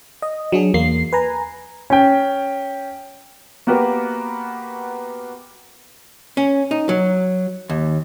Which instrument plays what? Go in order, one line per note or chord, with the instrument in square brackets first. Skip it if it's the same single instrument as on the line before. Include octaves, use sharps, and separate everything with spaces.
[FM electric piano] D#5
F#3 D4 G#4
E2 A#3 C7
B4 G#5 A#5
[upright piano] C#4 G5
[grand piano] A#3 B3 F#4 G4 A#4 B4
[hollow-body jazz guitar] C#4
D#4
F#3
D#2